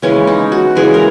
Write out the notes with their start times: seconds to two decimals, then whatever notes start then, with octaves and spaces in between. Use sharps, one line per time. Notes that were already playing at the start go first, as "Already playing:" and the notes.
0.02 C#3 E3 G#3 C#4
0.27 D#4
0.52 F#4
0.75 C#3 E3 G#3 G#4
0.94 A#4